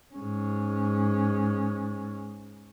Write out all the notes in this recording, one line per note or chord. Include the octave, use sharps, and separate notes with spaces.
G#2 C#4